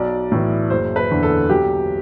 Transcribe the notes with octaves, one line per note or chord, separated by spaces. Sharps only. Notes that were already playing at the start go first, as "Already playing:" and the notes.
Already playing: B1 D5
A2 E3
F#1 C5
B4
E2 D3
A4
B1 G4